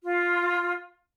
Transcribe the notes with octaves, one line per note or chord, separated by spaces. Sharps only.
F4